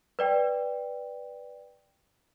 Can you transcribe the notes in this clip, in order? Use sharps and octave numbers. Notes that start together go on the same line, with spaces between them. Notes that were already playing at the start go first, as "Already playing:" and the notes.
B4 D5 G5